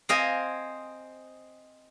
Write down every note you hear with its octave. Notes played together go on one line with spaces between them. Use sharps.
C4 C5 D#5 F5 G#5